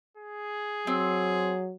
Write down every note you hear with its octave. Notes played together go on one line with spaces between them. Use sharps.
G#4
F#3 C4